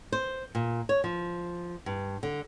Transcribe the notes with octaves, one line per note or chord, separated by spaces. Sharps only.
C5
A#2
C#5
F3
G2
D3